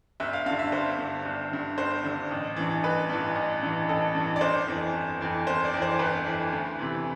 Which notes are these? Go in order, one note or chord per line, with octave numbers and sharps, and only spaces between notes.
G1 E5
F5
G2 D3 F5
E5
G1 C5
G2 D3
G1
G2 D3
G1 C5
G2 D3
A1
G2 E3
A1 B4
G2 E3
A1
G2 E3
A1 A4
G2 E3
D5
G1 C5
F2 E3
G1
F2 E3
G1 C5
D5
F2 E3
C5
G1 B4
F2 E3
D2
C3 E3